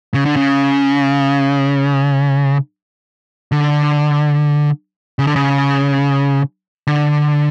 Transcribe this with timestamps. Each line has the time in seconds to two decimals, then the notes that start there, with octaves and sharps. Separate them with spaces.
0.14 C#3
0.25 D3
0.36 C#3
3.52 D3
5.19 C#3
5.27 D3
5.36 C#3
6.87 D3